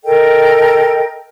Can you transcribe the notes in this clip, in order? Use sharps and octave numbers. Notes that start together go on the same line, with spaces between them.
A4 A#4 D#5 G5